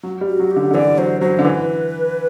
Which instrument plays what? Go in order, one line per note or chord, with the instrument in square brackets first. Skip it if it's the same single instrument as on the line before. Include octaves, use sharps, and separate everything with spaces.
[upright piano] F#3
G3
[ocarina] F#4
[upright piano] F#3
[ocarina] G4
[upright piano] D3
D3
[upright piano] E3 [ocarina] D5
[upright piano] F#3 [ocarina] C5
[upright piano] F#3 [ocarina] C5
[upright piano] D3
[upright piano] E3 [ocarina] B4